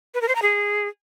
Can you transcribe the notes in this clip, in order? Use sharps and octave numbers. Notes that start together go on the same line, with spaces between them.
B4
A#4
C5
A#5
G#4